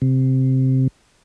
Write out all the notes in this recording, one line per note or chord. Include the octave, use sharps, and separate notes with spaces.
C3